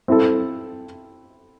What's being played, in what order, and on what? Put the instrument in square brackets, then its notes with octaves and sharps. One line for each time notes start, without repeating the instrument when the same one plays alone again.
[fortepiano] C4 E4 A4